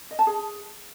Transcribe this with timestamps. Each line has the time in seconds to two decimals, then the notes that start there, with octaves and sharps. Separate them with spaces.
0.11 D#5
0.19 A5
0.27 G#4